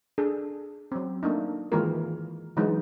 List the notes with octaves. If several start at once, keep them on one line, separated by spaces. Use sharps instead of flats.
D4 G#4 A4
F#3 C4
A3 A#3 D4 D#4
D#3 E3 G#3 A#3 F4 A#4
D3 E3 F#3 G#3 D#4